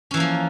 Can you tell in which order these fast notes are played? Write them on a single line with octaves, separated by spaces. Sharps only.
C#4 E3 A#3 F3